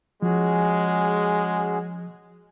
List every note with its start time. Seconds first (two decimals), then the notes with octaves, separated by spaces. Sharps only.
0.22 F3 G#3 C#4 F#4 G#4